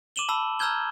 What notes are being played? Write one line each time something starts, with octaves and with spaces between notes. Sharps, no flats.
D6 D#7 E7 F#7 G7
A5 B5 E6
A#5 E6 F6 G6 G#6 G7